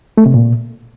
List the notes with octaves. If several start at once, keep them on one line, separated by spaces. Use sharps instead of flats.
A3
C3
A#2